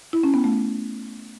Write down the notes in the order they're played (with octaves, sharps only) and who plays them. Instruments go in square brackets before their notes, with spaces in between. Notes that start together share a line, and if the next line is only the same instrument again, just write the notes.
[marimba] E4
C#4
B3
A3